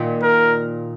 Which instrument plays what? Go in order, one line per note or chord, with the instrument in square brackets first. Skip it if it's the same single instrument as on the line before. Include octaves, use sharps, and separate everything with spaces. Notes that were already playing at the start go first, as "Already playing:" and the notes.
Already playing: [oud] A#2 D#3
[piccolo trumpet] A#4